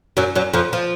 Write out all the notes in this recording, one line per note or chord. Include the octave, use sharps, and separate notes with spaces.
F#2 F#3
F#2 F#3
F2 F3
F3